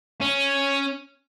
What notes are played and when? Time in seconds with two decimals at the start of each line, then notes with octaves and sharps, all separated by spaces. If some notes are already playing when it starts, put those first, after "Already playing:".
0.21 C#4